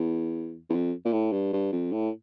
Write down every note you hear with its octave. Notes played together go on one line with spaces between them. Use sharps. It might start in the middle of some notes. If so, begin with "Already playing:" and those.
Already playing: E2
E2
F2
A#2
A2
G2
G2
F2
A2